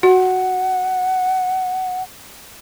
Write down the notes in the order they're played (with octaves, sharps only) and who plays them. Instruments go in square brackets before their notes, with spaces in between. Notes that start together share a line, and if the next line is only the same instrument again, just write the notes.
[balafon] F#4 [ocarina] F#5